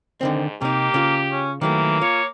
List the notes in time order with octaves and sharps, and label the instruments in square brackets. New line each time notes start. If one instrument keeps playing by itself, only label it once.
[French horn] G#2 [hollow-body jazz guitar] D3 D#3 C4
[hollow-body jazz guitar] C3 D#4 [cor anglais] A#3 [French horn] G4
[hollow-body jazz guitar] C#3 F4
[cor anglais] C#4
[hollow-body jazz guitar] D#3 F#3 A3 [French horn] E3 [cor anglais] A#3
[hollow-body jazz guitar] F4 [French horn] C#5